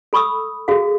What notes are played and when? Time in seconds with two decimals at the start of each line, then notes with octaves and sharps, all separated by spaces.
0.13 A4 B5 C#6 D#6 E6
0.68 F#4 G#4 A4 F5